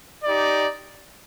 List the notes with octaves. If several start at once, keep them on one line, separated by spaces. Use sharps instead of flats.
D#4 G4 D5